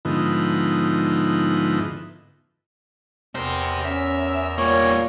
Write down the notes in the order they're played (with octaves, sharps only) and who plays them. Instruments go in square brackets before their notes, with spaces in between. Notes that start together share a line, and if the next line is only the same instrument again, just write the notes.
[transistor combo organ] G#2 D3 F3 B3 D#4 E4
[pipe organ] E2 A#4 [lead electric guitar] G4 C5
[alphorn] C#4 [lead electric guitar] E5
[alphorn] A#2 [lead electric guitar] G3 A#3 [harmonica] C#5